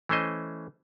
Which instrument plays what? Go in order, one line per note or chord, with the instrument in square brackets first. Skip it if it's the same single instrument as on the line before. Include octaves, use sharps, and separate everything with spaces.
[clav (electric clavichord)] E3 A3 C#4 C5 D#5